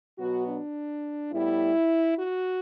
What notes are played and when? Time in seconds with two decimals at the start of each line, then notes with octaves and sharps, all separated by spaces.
0.18 B2 F#3 B3 F#4
0.46 D4
1.32 A2 G3 B3 E4
2.18 F#4